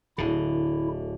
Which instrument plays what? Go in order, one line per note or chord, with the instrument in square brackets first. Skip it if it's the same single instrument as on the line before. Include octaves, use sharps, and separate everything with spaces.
[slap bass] D1 D3 [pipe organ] E4